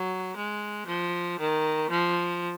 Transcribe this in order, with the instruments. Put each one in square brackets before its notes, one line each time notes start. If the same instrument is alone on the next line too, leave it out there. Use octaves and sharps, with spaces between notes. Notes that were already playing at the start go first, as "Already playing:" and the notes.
Already playing: [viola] F#3
G#3
F3
D#3
F3